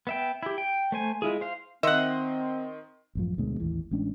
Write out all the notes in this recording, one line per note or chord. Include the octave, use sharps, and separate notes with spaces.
B3 E5 G5
E4 G4
G5
A3 C5 G#5
G#3 E4 F4 G#4
C5 F5
D#3 C4 D#5 E5 F#5 C6
A1 F#2 F3
D2 B2 G#3
A1 D#2 E3
A1 G#3 C#4 D4